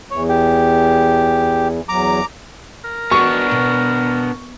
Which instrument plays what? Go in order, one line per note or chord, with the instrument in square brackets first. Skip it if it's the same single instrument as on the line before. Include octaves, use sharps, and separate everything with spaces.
[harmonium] E2 [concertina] C#5
[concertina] G4
[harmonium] E2 F#3 [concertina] A#5 D6
[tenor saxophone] A#4
[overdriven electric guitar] B3 D4 [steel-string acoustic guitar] F#4 D#5 F#5 [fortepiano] C#6
[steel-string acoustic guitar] B2